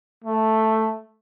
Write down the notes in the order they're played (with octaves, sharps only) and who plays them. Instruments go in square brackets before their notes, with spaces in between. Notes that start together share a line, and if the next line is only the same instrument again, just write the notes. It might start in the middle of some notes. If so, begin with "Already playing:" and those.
[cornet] A3